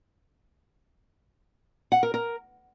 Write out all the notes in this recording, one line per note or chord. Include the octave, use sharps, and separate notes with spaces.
F#5
A#4
A#4